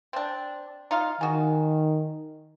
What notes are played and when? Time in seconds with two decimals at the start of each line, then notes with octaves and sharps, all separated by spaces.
0.13 C4 D4
0.91 D#4 F4 F5
1.21 D#3 F#4 G#4